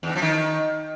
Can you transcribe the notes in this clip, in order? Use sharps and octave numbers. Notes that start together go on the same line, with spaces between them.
E2
E3
F3
D#3